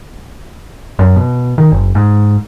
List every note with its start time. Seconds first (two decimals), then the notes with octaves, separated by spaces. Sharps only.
0.99 F#2
1.16 B2
1.58 D#3
1.71 F#1
1.95 G#2